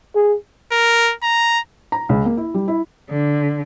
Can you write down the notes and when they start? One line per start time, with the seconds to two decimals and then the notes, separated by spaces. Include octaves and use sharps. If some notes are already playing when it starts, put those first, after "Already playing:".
0.15 G#4
0.72 A#4
1.23 A#5
1.92 A#5
2.09 C#2
2.25 A#3
2.37 E4
2.54 G3
2.68 E4
3.10 D3